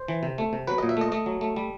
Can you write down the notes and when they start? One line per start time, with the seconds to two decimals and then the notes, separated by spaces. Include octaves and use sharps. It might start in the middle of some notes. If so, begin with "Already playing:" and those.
Already playing: C5
0.08 E3
0.23 C3
0.38 A3
0.53 C3
0.67 F#3 B4
0.78 A#2 D#5
0.89 E5
0.97 A3 D#5
1.12 A3 D#5
1.26 F#3
1.41 A3
1.56 G3